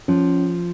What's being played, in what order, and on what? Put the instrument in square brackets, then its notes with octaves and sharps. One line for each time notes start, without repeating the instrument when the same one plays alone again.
[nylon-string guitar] F3 [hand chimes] C#4